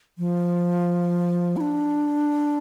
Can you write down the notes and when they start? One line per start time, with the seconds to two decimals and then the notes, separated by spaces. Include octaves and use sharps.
0.18 F3
1.57 E4
1.61 D4